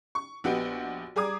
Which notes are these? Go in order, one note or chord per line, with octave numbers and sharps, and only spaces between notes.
C#6
A#1 B3 F#4 G4 D#5 D7
G3 G#4 A#5 D6 D#6 G#6